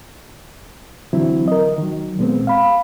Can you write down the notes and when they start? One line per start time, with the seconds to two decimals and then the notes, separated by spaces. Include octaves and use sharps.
1.13 D3 E3 F#3 C4 E4
1.48 A#4 D#5
1.78 D#3 F#3
2.19 A#2 G#3 B3 C4
2.47 F5 B5